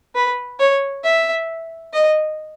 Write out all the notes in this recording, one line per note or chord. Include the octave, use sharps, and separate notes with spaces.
B4
C#5
E5
D#5